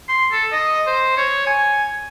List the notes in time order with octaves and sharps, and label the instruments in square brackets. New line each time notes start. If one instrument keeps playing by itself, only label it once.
[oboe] C6
A4
D#5
C5
C#5
G#5